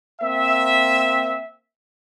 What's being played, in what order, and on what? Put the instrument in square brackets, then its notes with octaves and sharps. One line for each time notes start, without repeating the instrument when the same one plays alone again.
[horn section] A#3 C4 E5